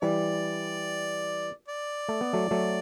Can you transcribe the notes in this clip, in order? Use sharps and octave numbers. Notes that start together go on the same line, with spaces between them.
E3 G3 D5
D5
A3
B3
F#3 A3
F#3 A3